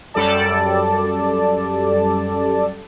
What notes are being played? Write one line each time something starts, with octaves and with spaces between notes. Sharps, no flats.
F#2 G3 A4 D5 A5